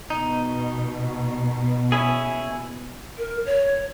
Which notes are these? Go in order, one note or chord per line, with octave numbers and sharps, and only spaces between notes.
B2 D#4
C#4 E4 G#4
A#4
C#5